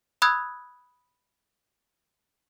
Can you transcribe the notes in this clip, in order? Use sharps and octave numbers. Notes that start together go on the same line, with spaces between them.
B5 D#6 E6 F#6 G#6